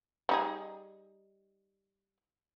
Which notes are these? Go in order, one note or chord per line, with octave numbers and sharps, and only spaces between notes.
G3 D#4 G#4